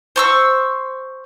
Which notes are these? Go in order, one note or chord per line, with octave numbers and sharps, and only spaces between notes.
C5 C#6 E6